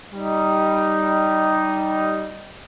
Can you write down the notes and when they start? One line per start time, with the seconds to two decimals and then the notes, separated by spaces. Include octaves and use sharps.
0.14 G3 D#4